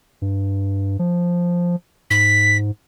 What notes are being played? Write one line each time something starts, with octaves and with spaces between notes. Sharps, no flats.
G2
F3
G#2 B6